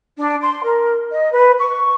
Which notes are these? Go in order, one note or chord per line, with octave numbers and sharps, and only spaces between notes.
D4
C6
A#4
D#5
B4
C#6